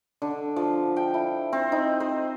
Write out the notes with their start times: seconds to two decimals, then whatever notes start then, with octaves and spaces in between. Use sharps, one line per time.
0.22 D3
0.56 F3
0.97 G5
1.14 E4
1.53 C4
1.72 D#4
2.00 C5